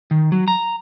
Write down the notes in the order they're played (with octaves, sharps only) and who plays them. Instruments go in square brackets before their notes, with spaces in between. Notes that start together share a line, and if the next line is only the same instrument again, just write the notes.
[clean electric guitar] D#3
F#3
A#5